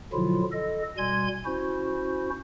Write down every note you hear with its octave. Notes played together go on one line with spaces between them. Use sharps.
B2 D3 F3 F#3 E4 F4
A4 D#5
B2 G3 G#5 C6 G#6
C#4 E4 F#4 C5